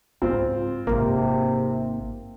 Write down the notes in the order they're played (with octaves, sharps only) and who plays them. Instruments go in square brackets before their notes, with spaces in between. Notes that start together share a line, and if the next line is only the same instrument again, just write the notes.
[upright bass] C#2 G#2 [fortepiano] C4 F4
[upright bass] G#1 D#4 [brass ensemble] C3 [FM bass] A#3